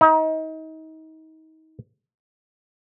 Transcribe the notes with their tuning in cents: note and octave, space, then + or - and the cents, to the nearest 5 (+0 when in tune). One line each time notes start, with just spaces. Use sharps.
D#4 +30